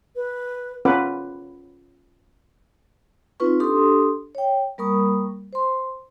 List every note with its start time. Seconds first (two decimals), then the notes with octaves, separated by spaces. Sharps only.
0.16 B4
0.85 C#4 F4 A#4 B4 F#5 D6
3.40 C4 D#4 F4 B4 C#6
3.60 D4 G4 A4 C6 D#6
4.35 C#5 G5
4.78 G3 A#3 A#4 B5 C#6 D#6
5.53 C5 C6